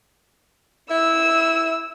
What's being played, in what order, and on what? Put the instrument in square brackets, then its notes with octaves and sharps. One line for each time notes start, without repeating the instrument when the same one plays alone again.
[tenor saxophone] E4 [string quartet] E6